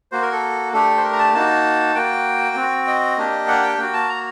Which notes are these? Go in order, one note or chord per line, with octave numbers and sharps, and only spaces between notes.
A#3 F#4 C5
A#4
A4
A3 D4 G4 A4
C5
A#4
A#5
A5
A#3 D#4 F#4 A5
A#3 F#4 G5
C4 F#4
D#5
A#3 D4 G4
F#5
G5
A#3 F#4 G5
A5
A#5